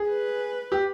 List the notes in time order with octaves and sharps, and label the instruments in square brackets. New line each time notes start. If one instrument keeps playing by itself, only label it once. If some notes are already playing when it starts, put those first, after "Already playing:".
Already playing: [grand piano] G#4
[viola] B4
[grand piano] G4